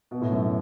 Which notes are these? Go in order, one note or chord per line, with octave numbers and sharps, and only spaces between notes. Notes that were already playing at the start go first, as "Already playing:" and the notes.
B2
A2
F#2